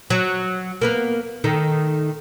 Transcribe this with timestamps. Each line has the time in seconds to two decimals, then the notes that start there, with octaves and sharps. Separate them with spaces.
0.10 F#3
0.81 A#3 B3 A#4
1.44 D#3 A3 D#4